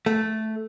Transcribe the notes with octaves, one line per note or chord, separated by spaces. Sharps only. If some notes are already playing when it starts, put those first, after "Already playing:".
A3